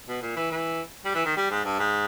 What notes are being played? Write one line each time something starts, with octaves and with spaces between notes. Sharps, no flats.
B2
A#2
E3
E3
G3
E3
D#3
G3
G#2
G2
G#2